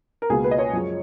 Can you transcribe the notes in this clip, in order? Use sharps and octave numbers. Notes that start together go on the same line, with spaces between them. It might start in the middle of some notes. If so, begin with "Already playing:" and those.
A#4
C#2 B2 A#3 G#4
B4
D#5
C#5
F#2 F3 G#3